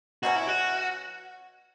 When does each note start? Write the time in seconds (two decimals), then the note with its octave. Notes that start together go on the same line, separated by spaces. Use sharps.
0.23 B2 F#3 C#4 F#4
0.36 E4
0.47 F#4